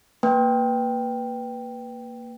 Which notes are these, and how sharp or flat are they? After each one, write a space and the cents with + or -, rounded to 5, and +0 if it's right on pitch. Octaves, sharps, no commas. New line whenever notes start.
A#3 -5 B4 +0 G5 +0